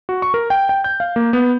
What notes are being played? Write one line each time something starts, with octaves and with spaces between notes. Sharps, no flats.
F#4
C#6
A#4
G5
G5
G6
F5
A#3
B3